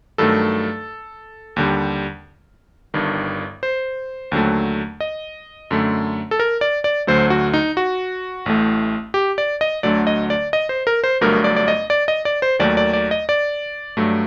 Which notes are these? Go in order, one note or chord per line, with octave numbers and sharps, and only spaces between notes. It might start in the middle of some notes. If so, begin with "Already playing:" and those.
G2 D#3 F#3 A3 A4
D#2 D3 G3
G1 G2 D#3
C5
D#2 D3 F#3 A3
D#5
F#2 D3 A3
A4
A#4
D5
D5
D2 D3 F#3 A3 C5
F#4
D#4
F#4
A1 A2 A3
G4
D5
D#5
D2 D3 F#3 A3 D5
D#5
D5
D#5
C5
A#4
C5
G1 G2 F#3 A3 A#4
D5
D5
D#5
D5
D#5
D5
C5
D#2 D#3 F#3 A3 D5
D5
D5
D#5
D5
G2 F#3 A3